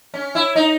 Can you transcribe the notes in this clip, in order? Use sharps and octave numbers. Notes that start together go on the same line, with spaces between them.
C#4
E4
D#4